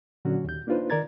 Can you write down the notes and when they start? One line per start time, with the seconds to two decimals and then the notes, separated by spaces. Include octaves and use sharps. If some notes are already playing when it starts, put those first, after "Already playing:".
0.25 A#2 D3 F#3 C#4 F#4
0.44 D#2 G6
0.67 A#3 D4 D#4 F4 B4 C5
0.90 D#3 A#4 D5 A#5 G#6 A6